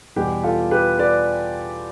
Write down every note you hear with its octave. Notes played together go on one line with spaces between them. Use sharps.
E2 B2 G3 G4
F4 A4
G4 B4
B4 D5